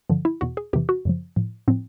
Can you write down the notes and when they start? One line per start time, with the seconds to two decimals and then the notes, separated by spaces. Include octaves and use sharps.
0.10 G2 D3 F3
0.25 E4
0.41 E2 B2 F#4
0.57 G#4
0.73 E2 C3 E3 G4
0.89 F#4
1.05 F#2 C#3 F3
1.36 A2 F3
1.68 A2 F3 C4